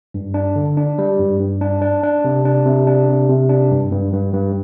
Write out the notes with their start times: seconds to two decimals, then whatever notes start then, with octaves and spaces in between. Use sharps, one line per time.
0.14 G2
0.34 D4
0.56 D3
0.77 D4
0.98 G3
1.19 G2
1.40 G2
1.61 D4
1.81 D4
2.03 D4
2.24 C3
2.45 D4
2.66 C3
2.87 D4
3.08 C3
3.30 C3
3.49 D4
3.71 G2
3.91 G2
4.13 G2
4.33 G2